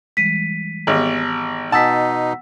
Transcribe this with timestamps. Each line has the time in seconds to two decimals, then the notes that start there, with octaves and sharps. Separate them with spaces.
0.17 E3 G3 G#3 B6 D#7
0.87 G#1 B3 G4 C#5
1.72 B2 D#4 F#5 G#5 A5 D#6 E6 B6